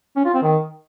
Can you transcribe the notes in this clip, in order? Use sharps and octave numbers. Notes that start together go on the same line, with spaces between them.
C#4
F4
C4
D#3